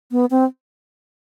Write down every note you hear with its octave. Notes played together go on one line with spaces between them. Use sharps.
B3
C4